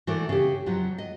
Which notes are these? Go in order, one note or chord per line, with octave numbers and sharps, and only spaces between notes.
E3 A3 F#4 A#4 D5
C#3 G4
F2 F3 F#3
D#5